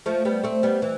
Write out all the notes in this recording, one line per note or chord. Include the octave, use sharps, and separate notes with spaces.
F3 A3
G3 B3
A3 C4
G3 B3
E3